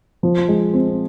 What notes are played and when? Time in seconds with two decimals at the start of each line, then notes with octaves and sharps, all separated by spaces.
0.23 F3
0.49 G#3
0.73 C4